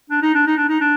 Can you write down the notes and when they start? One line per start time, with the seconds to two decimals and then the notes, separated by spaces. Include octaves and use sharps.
0.10 D4
0.22 D#4
0.35 D4
0.46 D#4
0.57 D4
0.69 D#4
0.80 D4